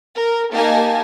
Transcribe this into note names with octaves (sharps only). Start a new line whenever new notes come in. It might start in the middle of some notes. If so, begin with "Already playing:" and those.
A#4
A#3 D#4 G4 G#5 A5